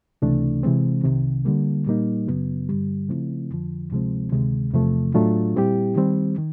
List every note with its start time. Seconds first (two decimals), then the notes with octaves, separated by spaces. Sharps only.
0.22 C#2 C3 E3 A3 D4
0.63 C3 E3 G#3 C4
1.04 C2 C3 D#3
1.45 D3 G3 A#3
1.86 A#2 G3 A#3 D#4
2.27 F#2 C#3 F#3 B3
2.69 G2 D3 G3
3.09 C#3 F3 A3 C4 E4
3.50 F2 D3 F3
3.91 D2 C3 F3 G#3 C4
4.32 D2 C3 D#3 G#3
4.73 E2 C3 F3 A3
5.14 A2 F#3 A3 D4 F4
5.55 A#2 G3 C4 E4 G4
5.96 D#3 G3 C4
6.38 D#3